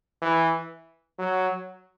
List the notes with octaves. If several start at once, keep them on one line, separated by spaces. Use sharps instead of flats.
E3
F#3